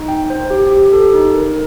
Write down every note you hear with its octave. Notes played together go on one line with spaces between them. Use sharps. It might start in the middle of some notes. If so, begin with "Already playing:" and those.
Already playing: D#4
G5
C5
G4
G4
A4
D#4
A#4